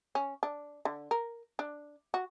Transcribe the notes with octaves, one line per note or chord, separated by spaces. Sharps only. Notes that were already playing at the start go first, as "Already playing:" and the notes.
C#4
D4
D3
A#4
D4
F#4